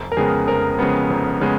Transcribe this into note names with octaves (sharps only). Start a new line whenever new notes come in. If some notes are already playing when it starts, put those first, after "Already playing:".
Already playing: F1
A#4
F2 C#3 G#3 B3 G#4
F1 A#4
F2 C#3 G#3 B3
F1
C#3 G#3 B3